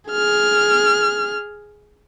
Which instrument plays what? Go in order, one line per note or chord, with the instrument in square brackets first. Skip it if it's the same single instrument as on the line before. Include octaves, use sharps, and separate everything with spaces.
[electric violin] G#4 F6